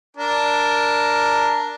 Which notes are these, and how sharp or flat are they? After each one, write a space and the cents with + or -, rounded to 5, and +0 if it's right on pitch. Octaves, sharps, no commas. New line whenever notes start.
D4 +0 A#4 +0